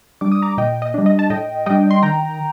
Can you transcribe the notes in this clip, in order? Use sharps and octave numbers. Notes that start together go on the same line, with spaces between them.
G3 D4 D6
D#6
A#5 D6
A#2 D#5 G5
D#5
G3 D4
D#5
A5
A2 D#5 G5
G3 D4 D#5 G5
C6
D#3 G5 A#5